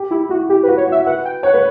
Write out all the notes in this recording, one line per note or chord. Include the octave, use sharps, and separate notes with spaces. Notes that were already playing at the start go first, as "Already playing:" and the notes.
Already playing: G4
E4 G4
E4 F#4
E4 G4
B4
F#4
C#5
F#4 E5
B4 F#5
G5
C#5 F#5
B4